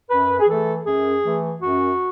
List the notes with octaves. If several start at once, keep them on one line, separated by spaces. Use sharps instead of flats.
F#2 B4
G#4
E3 A3 A4
F#2 G#4
E3 A3
F#2 F#4